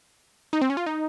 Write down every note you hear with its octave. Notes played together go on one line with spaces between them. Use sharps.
D#4
C4
C#4
F4
D#4